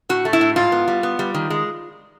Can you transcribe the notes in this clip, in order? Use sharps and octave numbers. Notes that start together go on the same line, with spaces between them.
A2 F#4
A3
E4
A2
G#2 F4
B3
G3
B3
G3
D#3
G#3